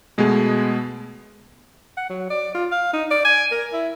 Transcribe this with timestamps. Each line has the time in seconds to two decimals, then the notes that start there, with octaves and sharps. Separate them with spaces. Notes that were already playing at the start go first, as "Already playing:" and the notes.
0.18 B2 G#3 A3 B3 G#4
1.97 F#5
2.10 F#3
2.30 D5
2.54 F4
2.72 F5
2.93 D#4
3.11 D5
3.25 G#5
3.51 A#4
3.73 E4